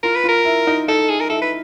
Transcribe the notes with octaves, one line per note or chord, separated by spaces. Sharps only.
F4 A#4
B4
F4 A#4
E4
D#4
D#4 A4
G#4
A#4
E4 A4
B4